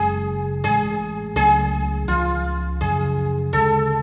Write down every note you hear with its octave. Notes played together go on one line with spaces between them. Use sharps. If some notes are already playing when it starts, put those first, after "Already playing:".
Already playing: F#1 F#2 C#3 G#3 G#4
A1 A2 G#3 G#4
C#2 C#3 F#3 A3 G#4
C#2 C#3 F3 F4
F#2 C#3 F3 G#4
D2 C#3 G#3 A4